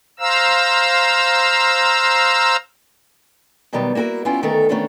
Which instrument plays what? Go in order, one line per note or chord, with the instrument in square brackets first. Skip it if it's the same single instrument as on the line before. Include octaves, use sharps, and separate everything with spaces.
[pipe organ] C5 F5 A#5 E6
[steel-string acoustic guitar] B2 D#3 F#3 G3 B3
A#3 E4 F#4 G4 A#4
B3 C#4 E4 F4 G4
D2 D#3 A3 B3 A4 A#4
D#3 E3 A3 B3 C#4 D4